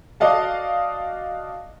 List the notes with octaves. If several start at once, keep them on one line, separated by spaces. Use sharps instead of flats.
F#4 D5 D#5 F5 A5